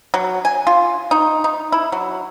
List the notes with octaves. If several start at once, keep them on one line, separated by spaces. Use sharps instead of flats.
F#3
G#5
F4
D#4
D#4
E4
F#3